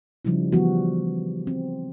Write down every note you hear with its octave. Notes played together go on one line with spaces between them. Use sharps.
C#3 F3 G3 D#4 E4
E3 F3 G3 B3 F#4
C4